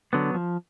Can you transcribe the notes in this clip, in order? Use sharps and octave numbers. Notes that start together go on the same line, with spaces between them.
D3 F#3 B3
F3